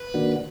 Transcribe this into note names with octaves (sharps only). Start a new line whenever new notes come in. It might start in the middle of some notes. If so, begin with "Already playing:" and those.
Already playing: B4
D#3 A#3 D4 F#4